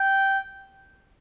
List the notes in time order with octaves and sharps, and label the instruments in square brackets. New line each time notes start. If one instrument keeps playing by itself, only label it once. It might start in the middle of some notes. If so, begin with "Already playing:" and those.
Already playing: [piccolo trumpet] G5